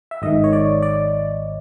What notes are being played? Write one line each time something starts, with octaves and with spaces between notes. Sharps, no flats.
E5
G#1 G#2 D#3 D#5
C#5
D5
D5